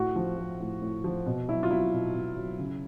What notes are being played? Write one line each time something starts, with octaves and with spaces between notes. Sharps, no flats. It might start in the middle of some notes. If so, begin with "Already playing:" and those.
Already playing: A2 F#4
F3
F3
A2
A2
F3
B2
F#3 E4
F4
F#3 E4
B2
B2
F#3
C#3